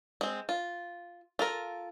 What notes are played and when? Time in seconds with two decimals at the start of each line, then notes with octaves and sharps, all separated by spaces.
0.21 G#3 C4
0.49 F4
1.39 F4 A4 A#4